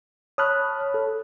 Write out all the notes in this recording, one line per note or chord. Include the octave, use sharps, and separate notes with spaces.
C#5 A5 B5 D#6 F6 F#6
A4